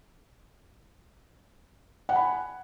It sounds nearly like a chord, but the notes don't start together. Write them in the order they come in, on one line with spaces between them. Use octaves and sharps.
F#5 G#5 B5